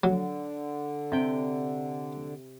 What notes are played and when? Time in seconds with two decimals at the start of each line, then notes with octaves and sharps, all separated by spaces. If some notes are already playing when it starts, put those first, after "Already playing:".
0.04 D3 F#3
1.12 C3 G5